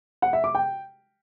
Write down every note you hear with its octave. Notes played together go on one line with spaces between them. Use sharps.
F#5
E5
D6
G5